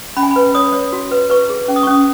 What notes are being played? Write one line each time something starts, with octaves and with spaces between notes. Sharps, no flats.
C#4 B5
G#5
B5
B4
C#5 D#6
C#5
F#4
B4
B4 C#6
G#4
C#4
D#6
C#6
C#4 D#6